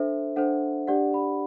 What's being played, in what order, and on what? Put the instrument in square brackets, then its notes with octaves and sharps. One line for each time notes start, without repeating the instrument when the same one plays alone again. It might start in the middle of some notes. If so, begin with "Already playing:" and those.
Already playing: [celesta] D4 A4 C5 E5
D4 A4 C5 F#5
D4 G4 D5 F#5
B5